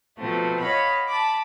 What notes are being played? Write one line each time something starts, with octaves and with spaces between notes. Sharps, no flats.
B2 F3 A3 C4
C#5 D#5 F5 F#5 B5
A5 B5 D6